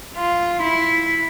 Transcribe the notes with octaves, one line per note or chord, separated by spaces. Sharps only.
F4
E4